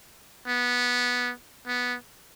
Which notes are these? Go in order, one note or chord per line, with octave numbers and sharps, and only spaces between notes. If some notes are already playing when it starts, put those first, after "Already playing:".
B3
B3